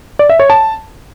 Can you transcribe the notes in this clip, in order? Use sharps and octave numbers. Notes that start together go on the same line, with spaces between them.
D5
E5
C#5
A5